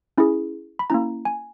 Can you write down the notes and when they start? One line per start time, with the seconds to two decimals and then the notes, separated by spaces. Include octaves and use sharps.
0.18 C#4 E4 G#4
0.79 B5
0.90 A#3 C#4 E4 A#5
1.25 G#5